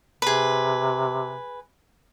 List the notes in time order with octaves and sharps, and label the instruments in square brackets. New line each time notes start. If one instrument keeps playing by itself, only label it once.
[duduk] C3 [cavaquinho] G#4 B4